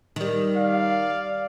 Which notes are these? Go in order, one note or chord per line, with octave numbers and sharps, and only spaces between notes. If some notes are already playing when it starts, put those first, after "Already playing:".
D#3 G3
D5 F5